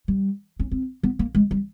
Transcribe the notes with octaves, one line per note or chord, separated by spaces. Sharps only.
G3
C#4
C4
B3
A#3
G#3
G3